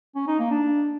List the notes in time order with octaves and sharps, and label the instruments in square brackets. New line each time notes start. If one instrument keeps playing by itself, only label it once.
[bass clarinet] C#4
D#4
A#3
D4